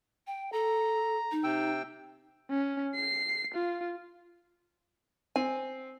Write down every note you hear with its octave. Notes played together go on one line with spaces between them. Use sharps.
G5
A4 A#5
D#4
C3 G5 E6
C#4
C7
F4
C4 G#5